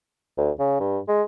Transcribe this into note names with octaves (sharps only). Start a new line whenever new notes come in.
D2
C#3
G2
G#3